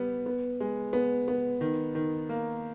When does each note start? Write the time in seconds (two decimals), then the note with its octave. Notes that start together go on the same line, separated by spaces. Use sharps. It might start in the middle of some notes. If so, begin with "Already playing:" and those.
Already playing: G3 B3
0.26 B3
0.60 G#3
0.93 B3
1.28 B3
1.61 D#3
1.95 D#3
2.29 A#3